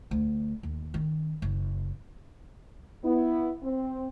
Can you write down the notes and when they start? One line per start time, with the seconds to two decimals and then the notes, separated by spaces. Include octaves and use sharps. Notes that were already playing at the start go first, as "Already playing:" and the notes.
0.11 D2
0.63 D#2
0.94 D#3 C#4
1.42 F#1
3.03 B3 E4
3.63 C4